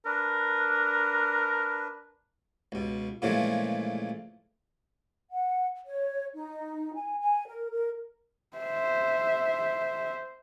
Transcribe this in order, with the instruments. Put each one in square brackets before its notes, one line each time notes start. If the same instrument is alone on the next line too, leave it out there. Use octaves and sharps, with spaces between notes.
[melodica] D4 B4 [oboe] A#4
[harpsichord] C#2 B2
A#2 C#3 E3 F3 G#3 A3
[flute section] F#5
C#5
D#4
G#5
G#5
A#4
A#4
[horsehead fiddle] C5 E5